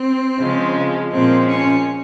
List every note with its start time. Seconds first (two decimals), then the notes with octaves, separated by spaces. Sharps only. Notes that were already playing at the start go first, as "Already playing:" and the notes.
Already playing: C4
0.38 C#3 F3 G#3
1.11 A#2 F3 G#3 C4
1.47 C#4